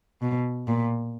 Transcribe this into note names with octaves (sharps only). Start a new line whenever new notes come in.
B2
A#2